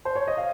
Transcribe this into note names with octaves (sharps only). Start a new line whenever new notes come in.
C5
C#5
D#5
F5